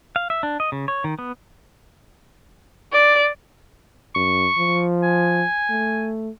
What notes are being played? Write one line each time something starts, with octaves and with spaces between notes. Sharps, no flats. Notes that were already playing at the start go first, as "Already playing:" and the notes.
F5
E5
D4
D#5
C#3
C#5
D#3
B3
D5
F#2 C#6
F3
G#5
A3